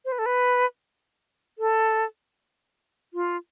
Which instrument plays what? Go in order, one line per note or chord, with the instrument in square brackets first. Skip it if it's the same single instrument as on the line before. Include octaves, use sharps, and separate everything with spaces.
[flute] C5
B4
A4
B4
A4
F4